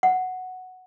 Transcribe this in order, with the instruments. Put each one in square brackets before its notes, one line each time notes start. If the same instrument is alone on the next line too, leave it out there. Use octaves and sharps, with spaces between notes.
[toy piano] F#5